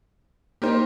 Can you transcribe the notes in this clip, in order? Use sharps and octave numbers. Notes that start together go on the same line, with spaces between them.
A#3 D#4 G4 A#4 C5